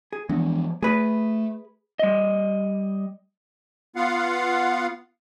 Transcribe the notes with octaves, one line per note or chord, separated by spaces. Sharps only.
G#4
E2 F3 G#3 D4
A3 G#4 B4
G3 D#5
B3 F4 F5 F#5